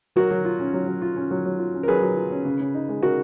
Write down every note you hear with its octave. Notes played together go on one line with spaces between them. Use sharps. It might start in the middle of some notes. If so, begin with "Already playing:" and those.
F#3 F#4 A#4
F#3
F4
C#4
F#3
F#3
F4
C#4
F#3
F#3
F4
C#4
A#4
F#3 G#4 B4
F#3
F4
C#4
C#3
C#3
D#4
G#3
C#3 F#4 A#4